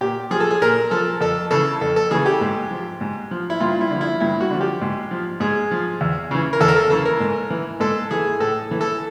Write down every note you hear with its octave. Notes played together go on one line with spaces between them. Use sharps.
A#2 G4
F3 G#4
A4
G#4
A#2 A#4
F3 A4
F2 A4
C#3 E3 A4
F2 A4
A4
C#3 E3 G#4
G4
G#2
F3
G#2
F3
E4
G2 F4
E4
D3 F3
E4
G2 E4
F#4
D3 F3
G4
G#2
F3
G#2 G#4
F3
E2
C#3 E3
A#4
E2 A4
A#4
A4
C#3 E3 A4
A#4
G#2
E3
G#2 A4
E3 G#4
A2 A4
E3
A4